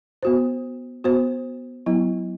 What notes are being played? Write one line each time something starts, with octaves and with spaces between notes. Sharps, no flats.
B3 F#4 C5
B3 F#4 C5
F#3 B3 E4